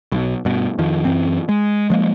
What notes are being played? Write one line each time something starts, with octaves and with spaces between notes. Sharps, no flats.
B1
G2 B2
F2 D#3 F3
F#2 E3 C4
G#3
F3 G#3 A#3